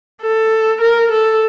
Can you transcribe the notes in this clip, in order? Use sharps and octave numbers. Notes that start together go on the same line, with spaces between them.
A4
A#4
A4